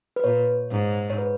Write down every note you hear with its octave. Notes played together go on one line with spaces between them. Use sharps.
B4
A#2 C#5
G#2
C#5
B4